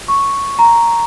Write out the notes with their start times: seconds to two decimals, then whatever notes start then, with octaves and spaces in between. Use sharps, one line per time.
0.08 C#6
0.59 A#5